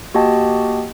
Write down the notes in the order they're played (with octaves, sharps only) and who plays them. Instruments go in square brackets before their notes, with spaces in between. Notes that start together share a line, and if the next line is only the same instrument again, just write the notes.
[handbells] A#3 F#4 G4 D#5 G5 A5